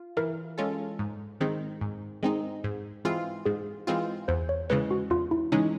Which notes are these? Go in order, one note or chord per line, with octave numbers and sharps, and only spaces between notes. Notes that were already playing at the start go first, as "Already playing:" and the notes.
Already playing: F4
E3 A#4
G#3 C#4 F4 A4
G#2
D#3 G#3 C4 D#4
G#2
D#3 G#3 C4 D#4
G#2
E3 G#3 C4 F4
G#2 G#4
E3 G#3 C4 F4
E2 C5
C#5
C#3 E3 G#3 C#4 B4
F#4
E2 F4
E4
C#3 E3 G#3 C#4 D#4